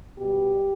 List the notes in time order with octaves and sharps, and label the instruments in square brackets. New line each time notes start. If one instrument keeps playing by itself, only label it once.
[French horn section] B2 G3 G4